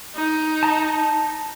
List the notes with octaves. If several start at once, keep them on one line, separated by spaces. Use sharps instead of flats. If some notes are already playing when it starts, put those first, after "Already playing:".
D#4
A5 A#5